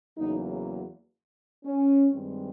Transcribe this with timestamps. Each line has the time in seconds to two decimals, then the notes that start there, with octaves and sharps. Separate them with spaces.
0.17 E2 C#3 F#3 A#3 D#4
1.64 C#4
2.13 G2 D#3 G#3 C4